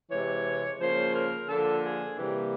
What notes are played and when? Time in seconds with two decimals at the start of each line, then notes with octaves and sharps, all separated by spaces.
0.10 C3 E3 G#3 C#5
0.79 C#3 F3 A#3 C5
1.14 A#4
1.49 D3 F3 A#3 A4
1.84 G#4
2.17 C3 E3 G3 A#3 G4